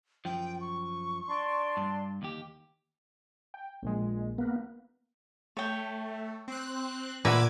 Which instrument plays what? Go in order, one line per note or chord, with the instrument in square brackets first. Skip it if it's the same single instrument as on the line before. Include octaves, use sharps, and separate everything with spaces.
[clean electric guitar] F#2 F3 [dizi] G5
[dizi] C#6
[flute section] D4 D5 C6
[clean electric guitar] G2
D#2 G4
[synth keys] G5
A#1 A#2 G#3
[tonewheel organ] A#3 B3
[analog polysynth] A3 [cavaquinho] C#5 G5
[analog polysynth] C4 F#6
[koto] A#2 [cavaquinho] B4 E5 F#5 [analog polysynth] D6 G#6